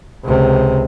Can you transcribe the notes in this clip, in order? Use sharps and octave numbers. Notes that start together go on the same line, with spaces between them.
C#2 C3